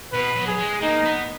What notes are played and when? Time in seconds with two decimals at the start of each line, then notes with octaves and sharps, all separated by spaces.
0.12 B2 B4
0.36 F#3
0.47 G#4
0.59 G#3
0.82 A#3 D#4
1.04 B3